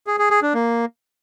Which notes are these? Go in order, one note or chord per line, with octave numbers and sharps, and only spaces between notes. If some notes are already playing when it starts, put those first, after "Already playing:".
G#4
G#4
G#4
D4
A#3